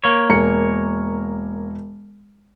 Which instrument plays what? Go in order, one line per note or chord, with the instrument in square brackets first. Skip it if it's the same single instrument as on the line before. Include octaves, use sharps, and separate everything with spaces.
[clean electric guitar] A#3 C#5
[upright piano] E1 A#4 C#7